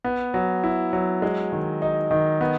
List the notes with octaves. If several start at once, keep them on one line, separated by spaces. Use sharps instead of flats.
B3
F#3
E4
F#3
G#3
D#3
D#4
D#3
B3